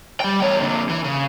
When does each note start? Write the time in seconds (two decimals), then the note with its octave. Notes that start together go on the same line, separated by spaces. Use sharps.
0.20 G3 G5
0.42 E2 C#5
0.60 A#2 D3
0.89 E3
1.04 C#3